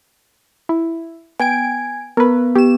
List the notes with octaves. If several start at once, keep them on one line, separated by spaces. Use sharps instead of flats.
E4
B3 G5 G#5 G#6 D7
B3 A#4 B4
B3 G4 E7